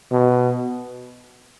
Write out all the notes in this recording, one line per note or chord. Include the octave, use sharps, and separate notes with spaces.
B2